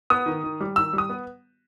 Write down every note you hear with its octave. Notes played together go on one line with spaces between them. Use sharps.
B3 D#6
D#3
D#3
G3
D#3 E6
G3
D#6
B3